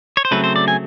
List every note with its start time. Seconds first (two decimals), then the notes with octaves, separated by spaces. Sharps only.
0.17 C#5
0.25 C5
0.31 C#3 F#3 A3 C4 B4
0.44 C5
0.56 D5
0.68 G#5